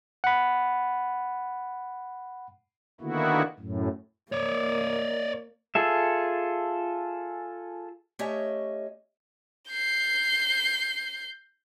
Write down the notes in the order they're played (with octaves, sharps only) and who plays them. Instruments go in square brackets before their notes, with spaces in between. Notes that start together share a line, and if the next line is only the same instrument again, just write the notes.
[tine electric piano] F#5 B5
[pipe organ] D3 D#3 A#3 B3 E4 F#4
F#2 A2
[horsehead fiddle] A#3 [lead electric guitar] C#5 D5
[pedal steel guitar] F4 G#4 A4 E5
[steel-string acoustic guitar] A3 C#4 G4 C#5 D#5 E5
[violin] G6 C7